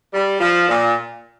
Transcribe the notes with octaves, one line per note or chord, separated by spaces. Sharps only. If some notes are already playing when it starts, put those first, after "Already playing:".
G3
F3
A#2